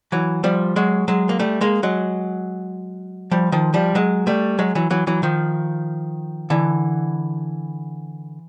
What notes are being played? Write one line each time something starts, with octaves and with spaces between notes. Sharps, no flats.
E3 F#3
F3 G3
F#3 G#3
F#3 G#3
A#3
G3 A3
G#3 A#3
F#3 G#3
F3 G3
D#3 F3
F3 G3
F#3 G#3
G3 A3
F#3 G#3
E3 F#3
E3 F#3
E3 F#3
D#3 F3
D3 E3